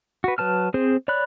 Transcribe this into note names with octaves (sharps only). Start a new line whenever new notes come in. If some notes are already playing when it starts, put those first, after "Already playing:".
F#4 B4
F#3 B4 A5 F6
C4 G#4 C5
C#5 D5 B5 F#6